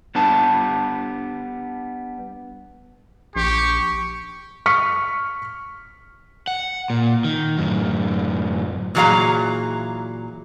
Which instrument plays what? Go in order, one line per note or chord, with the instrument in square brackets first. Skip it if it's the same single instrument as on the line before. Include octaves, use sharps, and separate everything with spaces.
[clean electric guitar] G3 B3 D4 A5
[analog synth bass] A#1 [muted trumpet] G4 [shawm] C#6
[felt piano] C#6 F6 B6 C#7
[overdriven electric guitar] F#5
A#2
D#3
F#2 A2
[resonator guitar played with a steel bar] A#2 E3 F#3 G#4 F5 A#5